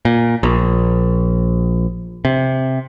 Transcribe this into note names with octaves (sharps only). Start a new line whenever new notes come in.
A#2
A#1
C3